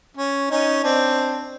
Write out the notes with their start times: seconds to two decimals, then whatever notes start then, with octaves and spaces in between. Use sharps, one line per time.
0.17 C#4
0.51 C#4 D#4
0.84 C4 D4